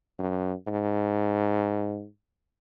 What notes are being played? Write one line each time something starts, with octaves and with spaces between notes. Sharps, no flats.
F#2
G#2